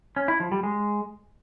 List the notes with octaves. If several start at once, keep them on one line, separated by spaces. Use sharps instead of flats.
C#4
E4
F3
G3
G#3